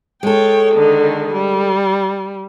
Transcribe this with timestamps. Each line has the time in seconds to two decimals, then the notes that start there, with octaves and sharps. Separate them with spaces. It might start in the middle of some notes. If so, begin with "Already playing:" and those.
0.23 G#3 A4 C#5 G5
0.74 D3 D#3
1.32 G3